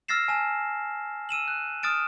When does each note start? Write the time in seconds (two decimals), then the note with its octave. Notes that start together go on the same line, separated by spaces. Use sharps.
0.08 E6 F6 A6 A#6 C7 E7
0.28 G#5 A5 E7
1.29 E6 D#7 E7 F#7
1.48 F#6
1.83 D#6 F6 A6 D7 E7